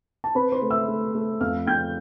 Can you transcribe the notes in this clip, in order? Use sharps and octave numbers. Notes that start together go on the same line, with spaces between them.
A5
C4 B4 B5
C5 C6
A3
E5 E6
A3
A3
F2 F5 F6
F2 G5 G6